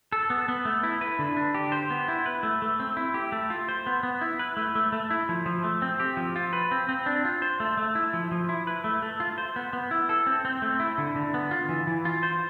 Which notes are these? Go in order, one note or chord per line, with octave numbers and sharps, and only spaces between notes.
A4
B3
B3
A3
E4
B4
D3
D4
G4
C5
B3
E4
B4
A3
A3
C4
E4
G4
A3
F4
C5
B3
B3
E4
B4
A3
A3
A3
E4
F3
F3
A3
C4
G4
F3
F4
B4
C4
C4
D4
F4
C5
A3
A3
E4
F3
F3
E4
B4
A3
A3
F4
C5
B3
B3
E4
A4
C4
C4
A3
E4
D3
D3
B3
F4
E3
E3
F4
C5